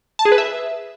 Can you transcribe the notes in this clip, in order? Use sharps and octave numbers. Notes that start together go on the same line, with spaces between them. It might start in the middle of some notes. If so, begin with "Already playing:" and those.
A5
G#4
B4
E5